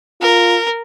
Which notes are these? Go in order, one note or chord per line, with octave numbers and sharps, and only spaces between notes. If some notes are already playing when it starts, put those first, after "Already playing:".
F4 A#4